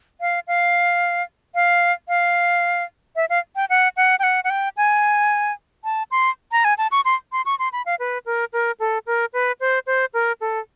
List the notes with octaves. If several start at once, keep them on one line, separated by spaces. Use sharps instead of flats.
F5
F5
F5
F5
E5
F5
G5
F#5
F#5
G5
F#5
F#5
G5
G#5
A5
C6
A#5
G#5
A5
C#6
C6
C6
C#6
C6
B5
F5
B4
A#4
A#4
A4
A#4
B4
C5
C5
A#4
A4